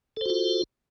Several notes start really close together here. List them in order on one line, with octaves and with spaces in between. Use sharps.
A4 C5 F#4 F4